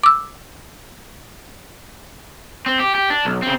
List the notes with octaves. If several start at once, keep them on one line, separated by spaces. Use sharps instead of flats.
D6 E6
C4
G4
G4
D4
B1
C#3 C4